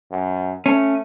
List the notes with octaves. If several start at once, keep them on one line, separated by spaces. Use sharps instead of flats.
F#2
A3 C#4